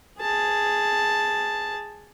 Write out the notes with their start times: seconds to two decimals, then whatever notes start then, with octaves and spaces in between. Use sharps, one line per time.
0.19 G#4 A5